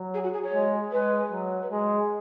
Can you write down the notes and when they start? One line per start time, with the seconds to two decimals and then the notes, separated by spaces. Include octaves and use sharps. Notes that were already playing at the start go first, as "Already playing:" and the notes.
Already playing: F#3
0.14 G#4
0.24 F#4
0.34 G#4
0.44 C#5
0.53 G#3
0.92 G#3 B4
1.31 F#3
1.62 B4
1.71 G#3 G#4